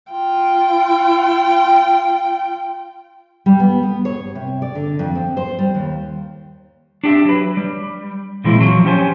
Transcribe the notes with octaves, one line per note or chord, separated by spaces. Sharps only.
F4 G5
G3
B3
B3
C#5
C3
D5
D3
F2
C4
C5
G3
D#2
D4 G4 E5
F#3 B4
G3
A#2 E3 G#3 C4 E4
F3 F#3
C#4 G4 C5 G#5